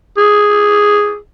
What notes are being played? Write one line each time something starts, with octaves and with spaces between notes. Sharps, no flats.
G#4